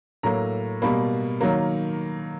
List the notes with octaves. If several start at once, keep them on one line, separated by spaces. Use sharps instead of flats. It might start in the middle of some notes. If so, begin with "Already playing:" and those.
A2 F#3 A#3 A#5
B2 G3 A#3 B5
D#3 F#3 A#3